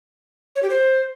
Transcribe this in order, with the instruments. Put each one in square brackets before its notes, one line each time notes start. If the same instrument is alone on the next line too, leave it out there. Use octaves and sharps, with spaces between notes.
[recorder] C#5
G4
C5